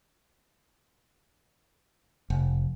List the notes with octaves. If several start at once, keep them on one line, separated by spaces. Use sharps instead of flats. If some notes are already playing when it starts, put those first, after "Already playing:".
F1